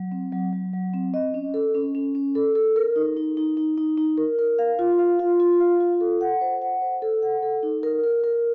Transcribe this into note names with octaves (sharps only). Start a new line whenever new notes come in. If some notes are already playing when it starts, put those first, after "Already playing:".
Already playing: F#3
C4
F#3
F#3
F#3
C4
D#5
C#4
A4
C#4
C#4
C#4
A4
A4
A#4
D#4
D#4
D#4
D#4
D#4
D#4
A#4
A#4
F5
F4
F5
F4
F4
F5
F4
A4
F#5
C5
F#5
C5
A4
F#5
A4
D#4
A#4
A#4
A#4